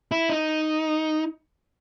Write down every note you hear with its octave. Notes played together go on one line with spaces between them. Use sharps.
E4
D#4